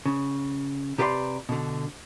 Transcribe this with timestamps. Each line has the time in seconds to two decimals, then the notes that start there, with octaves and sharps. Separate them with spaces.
0.06 C#3
0.98 C3 G4 B4 D5 F5 C6
1.49 B2 D3